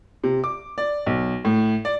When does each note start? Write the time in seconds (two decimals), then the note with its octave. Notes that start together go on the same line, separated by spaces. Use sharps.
0.24 C3
0.44 D6
0.78 D5
1.06 B1
1.45 A2
1.85 D5